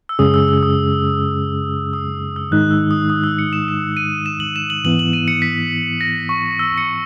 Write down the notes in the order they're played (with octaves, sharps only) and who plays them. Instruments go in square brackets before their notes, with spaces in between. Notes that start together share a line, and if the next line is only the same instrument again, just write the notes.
[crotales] E6
[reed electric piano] F#2 C#3 G#3 C#4 G#4 [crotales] D#6
[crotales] E6
E6
D#6
D#6
E6
[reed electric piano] G#2 D#3 G#3 D#4 [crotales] F#6
[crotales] E6
D#6
D#6
E6
C#7
E7
E7
D#7
E7
F#7
E7
F#7
[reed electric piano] G#2 E3 B3 E4 [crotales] F#7
[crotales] F#7
D#7
C#7
B6
A#6
C#6
E6
C#7